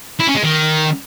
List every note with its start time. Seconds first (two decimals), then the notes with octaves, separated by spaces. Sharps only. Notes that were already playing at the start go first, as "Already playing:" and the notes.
0.20 E4
0.28 C#4
0.36 G#3
0.44 D#3